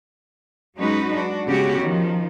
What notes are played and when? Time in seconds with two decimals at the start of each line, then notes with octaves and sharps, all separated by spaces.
0.77 F#3 G#3 C#4 D#4 F#4 B4
1.14 D4 F#4
1.47 C#3 G#3 B3 C#4 F#4 G4
1.80 D#3 F3